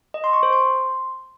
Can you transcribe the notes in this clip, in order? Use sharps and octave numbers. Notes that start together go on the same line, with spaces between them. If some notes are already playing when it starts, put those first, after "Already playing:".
D#5
C6
C#6
C5
C6